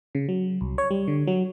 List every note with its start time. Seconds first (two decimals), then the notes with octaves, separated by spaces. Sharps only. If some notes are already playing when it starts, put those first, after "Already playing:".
0.15 C#3
0.29 F#3
0.61 C2
0.78 C#5
0.91 G3
1.08 D3
1.27 F#3